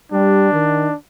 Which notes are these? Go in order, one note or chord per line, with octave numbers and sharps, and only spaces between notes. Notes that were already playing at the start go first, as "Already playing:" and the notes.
G3 D4
D#3